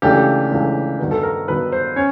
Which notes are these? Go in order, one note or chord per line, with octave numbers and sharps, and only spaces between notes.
C#2 C#3 E3 A3 D4 G4
C#2 C#3 E3 A3 D4
G2 D#3 F#3 B3
A4
A#4
G2 D#3 F#3 B3 B4
C5
C#4 C#5